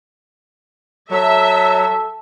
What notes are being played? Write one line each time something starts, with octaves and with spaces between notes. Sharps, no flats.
F#3 A4 E5